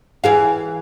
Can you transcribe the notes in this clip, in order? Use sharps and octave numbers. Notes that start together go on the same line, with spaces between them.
E3 G#4 F5